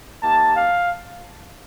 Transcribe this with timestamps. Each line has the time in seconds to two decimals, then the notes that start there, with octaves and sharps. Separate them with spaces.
0.21 A#3 D#4 G4 A5
0.55 F5